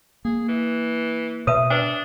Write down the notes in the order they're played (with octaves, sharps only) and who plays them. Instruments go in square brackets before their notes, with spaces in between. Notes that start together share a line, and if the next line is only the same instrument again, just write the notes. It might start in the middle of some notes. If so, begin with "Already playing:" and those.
[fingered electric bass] A#3 [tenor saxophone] G#4
[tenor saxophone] E3
[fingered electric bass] B2 [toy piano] B4 E5 [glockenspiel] D#6 D#7
[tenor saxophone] D4 [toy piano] B4 G5